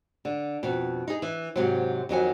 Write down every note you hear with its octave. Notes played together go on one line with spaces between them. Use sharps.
D3
F2 B2
D#4 G#4
E3
G#2 C3 F#3
F2 D#3 F#3 G#5